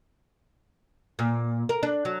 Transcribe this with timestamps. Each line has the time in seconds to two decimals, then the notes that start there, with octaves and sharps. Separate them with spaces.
1.19 A#2
1.69 A#4
1.83 D4
2.05 F#3